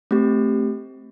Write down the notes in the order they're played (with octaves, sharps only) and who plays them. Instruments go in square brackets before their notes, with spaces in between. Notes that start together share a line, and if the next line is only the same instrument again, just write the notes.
[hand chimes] A3 C4 G4